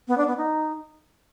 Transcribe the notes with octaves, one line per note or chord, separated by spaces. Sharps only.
B3
D4
B3
D#4